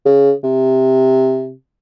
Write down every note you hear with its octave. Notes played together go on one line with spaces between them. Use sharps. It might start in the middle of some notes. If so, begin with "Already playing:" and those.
C#3
C3